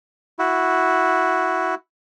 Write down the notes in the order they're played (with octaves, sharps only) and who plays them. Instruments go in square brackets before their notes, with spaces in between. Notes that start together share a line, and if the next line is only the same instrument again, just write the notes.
[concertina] E4 F#4